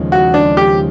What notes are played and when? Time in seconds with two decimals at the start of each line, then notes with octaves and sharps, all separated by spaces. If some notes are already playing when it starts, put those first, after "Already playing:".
Already playing: D#2 C#3 F3 G#3
0.12 F#4
0.34 D4
0.57 G4